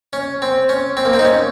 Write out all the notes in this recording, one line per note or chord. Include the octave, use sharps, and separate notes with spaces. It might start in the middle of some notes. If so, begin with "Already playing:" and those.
C#4
C4
C#4
C4
A#3
C4
D#4
C#4